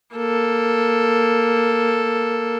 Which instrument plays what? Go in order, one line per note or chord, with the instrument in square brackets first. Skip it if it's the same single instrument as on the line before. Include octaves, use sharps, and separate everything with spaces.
[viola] A#3 A4